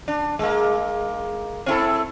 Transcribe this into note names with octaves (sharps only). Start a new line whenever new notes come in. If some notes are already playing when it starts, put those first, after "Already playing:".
D4
G#3 A#3
C4 E4 A4